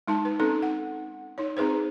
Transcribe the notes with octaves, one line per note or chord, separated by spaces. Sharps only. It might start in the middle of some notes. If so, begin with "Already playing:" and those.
G#3 D#4 A5
B4
C4 C#4 D#4 A4
F#5
D#4 C#5
C4 D#4 G#4 B4 C5